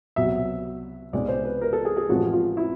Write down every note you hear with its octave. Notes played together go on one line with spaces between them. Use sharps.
C2 B2 F#3 E5
C2 B2 G#3 C4 D#4 D5
C5
B4
A#4
A4
G#4
G#4
A1 A2 F3 G#3 F#4
F4
E4